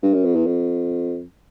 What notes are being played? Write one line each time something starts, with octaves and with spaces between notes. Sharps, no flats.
G2
F#2
F2
E2
F2